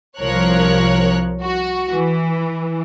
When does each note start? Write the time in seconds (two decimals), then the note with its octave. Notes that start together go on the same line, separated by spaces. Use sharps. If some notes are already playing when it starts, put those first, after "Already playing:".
0.18 C2 F3 A#4 C#5 F#6
1.42 F#4
1.91 E3